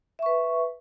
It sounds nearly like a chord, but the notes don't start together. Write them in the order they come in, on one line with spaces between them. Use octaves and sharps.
E5 C#6 B4